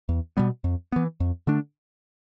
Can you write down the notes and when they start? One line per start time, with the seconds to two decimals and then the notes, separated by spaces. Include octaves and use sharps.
0.09 E2
0.37 B2 G3 B3
0.64 F2
0.92 E3 B3
1.20 F2
1.47 D3 A3 D4